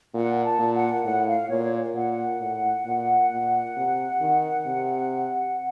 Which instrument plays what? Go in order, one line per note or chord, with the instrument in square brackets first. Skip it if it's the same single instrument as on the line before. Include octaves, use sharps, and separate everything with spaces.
[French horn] A#2 [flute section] F#5
[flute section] A5
[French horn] A#2
[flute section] F#5
[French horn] A2 [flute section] F#5
[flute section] F5
[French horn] A#2 [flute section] C#5
[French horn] A#2 [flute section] F#5
[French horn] A2
A#2
A#2
C3
D#3
C3